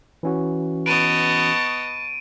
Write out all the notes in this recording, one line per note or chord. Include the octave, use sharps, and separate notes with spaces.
E3 C#4 F#4
B3 D#5 A5 C#6 D7 D#7